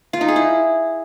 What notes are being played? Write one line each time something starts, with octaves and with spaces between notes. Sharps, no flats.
F4
D#4
G#4
E4